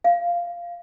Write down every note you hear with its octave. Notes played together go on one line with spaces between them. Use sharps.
F5